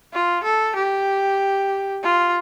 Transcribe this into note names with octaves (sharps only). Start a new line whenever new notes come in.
F4
A4
G4
F4